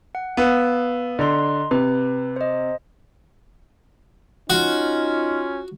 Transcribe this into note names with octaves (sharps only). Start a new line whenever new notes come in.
F#5
B3 F5 E6
D3 D#5 A#5 C6
C3 B4
C5 D#5
C#4 D#4 F4 F#4